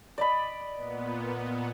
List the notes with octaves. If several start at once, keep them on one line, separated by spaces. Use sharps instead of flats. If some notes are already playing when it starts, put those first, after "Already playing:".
D5 D#5 B5
A#2 B3